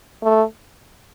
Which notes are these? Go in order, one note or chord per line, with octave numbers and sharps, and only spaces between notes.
A3